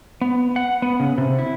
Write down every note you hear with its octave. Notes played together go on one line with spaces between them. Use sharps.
B3
F#5
B3
C#3
C3
E4